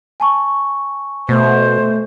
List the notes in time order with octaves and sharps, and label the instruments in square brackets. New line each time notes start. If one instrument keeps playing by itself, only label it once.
[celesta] G#5 A5 C#6
[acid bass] B2 [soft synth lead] A3 [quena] C5